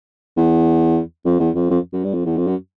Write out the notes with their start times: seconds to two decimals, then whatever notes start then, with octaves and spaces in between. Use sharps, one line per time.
0.37 E2
1.25 F2
1.40 E2
1.55 F2
1.70 F2
1.93 F#2
2.04 G2
2.14 F2
2.25 E2
2.37 F2
2.47 F#2